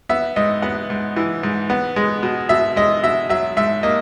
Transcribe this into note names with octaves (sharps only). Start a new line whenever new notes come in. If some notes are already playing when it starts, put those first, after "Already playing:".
B3 E5
G#2 D#5
B3 F#5
G#2
E3
G#2
B3
G#3
B2
B2 E5
G#3 D#5
B2 E5
F#3 E5
G#2 E5
A#3 D#5